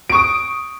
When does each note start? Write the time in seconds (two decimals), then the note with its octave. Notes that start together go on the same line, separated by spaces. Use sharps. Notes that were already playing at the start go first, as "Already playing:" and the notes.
0.10 D7
0.12 C#6
0.15 D#6